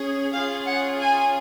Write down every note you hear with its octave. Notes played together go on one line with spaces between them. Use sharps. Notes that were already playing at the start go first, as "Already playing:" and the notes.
Already playing: C#4 G#4
C#4 F4 G#4 F5
F#5
G#5